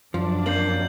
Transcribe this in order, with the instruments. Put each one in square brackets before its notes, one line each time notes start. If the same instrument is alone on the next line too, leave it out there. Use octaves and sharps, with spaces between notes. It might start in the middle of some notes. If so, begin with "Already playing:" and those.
[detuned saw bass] F#2 [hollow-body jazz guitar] F3 [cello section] D4
[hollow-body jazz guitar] F2 A#3 [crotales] G6 C7 F#7